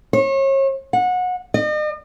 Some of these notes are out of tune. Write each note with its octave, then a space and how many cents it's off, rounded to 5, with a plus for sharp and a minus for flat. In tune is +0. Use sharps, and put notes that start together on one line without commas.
C#5 -35
F#5 -25
D#5 -40